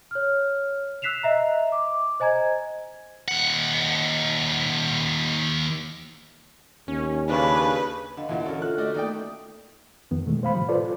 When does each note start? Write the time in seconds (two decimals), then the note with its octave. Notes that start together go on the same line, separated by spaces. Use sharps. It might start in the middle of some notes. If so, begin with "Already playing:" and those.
0.11 C#5 F6
1.02 E6 F#6 B6 C7 E7 F7
1.23 D#5 E5 A#5
1.72 D6
2.20 C5 D#5 G#5 A#5 G#6
3.28 D#2 F#5
6.88 D#2 C#4
7.29 C#3 D4 B4
8.17 D3 D#5 F5 F#5
8.29 E2 A#2 D3 E3 E5
8.46 C#4 F#4 A4 A#4 C#5
8.62 F4 A4 F#6
8.78 A3 F#4 D5 D#5
8.94 D#3 A#3 D5 G5 D#6
10.11 F2 D#3 B3
10.25 B2 D#3 E3 G#3 A3
10.43 C5 F5 B5
10.55 A2 C3 D#3 F3 F#3
10.69 F4 A4 B4 C5 D5